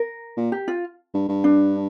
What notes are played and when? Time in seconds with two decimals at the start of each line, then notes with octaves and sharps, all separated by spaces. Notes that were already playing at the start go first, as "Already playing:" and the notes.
Already playing: A#4
0.37 A#2
0.52 G4
0.68 F4
1.14 G2
1.29 G2
1.44 D4